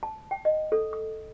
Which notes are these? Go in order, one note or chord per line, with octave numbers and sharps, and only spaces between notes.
A5
G5
D#5
A4
D#6